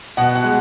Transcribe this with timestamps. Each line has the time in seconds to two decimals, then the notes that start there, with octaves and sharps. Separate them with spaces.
0.17 B2 F#5
0.36 F#5
0.44 G#3